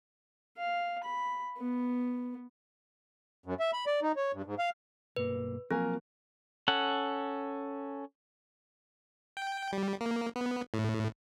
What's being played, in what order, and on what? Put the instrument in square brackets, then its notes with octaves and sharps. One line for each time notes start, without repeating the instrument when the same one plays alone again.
[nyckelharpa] F5
B5
B3
[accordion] F#2
E5
B5
D5
D#4
C#5
G2
G#2
F5
[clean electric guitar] B1 G2 A#3 [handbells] B4
[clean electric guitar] F3 F#3 A#3 [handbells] C4 [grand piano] A#4 G#5
[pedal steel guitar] C#4 A4 F#5
[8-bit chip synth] G5
G3
A#3
B3
A2